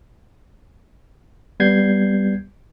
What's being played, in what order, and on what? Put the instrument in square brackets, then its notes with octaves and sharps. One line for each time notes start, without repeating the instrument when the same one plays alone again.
[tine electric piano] G3 B3 G6 G#6 C7